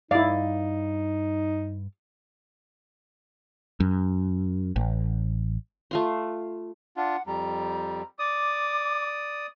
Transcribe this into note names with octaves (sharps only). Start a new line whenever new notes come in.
G2 D#4 E4 D5 F5
F#2
A1
A3 F4 C6
D4 F4 F#5
F2 G3 A#5
D5 D6 D#6